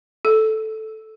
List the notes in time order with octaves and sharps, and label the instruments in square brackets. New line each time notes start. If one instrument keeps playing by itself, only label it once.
[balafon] A4